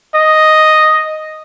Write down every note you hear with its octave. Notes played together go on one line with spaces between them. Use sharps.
D#5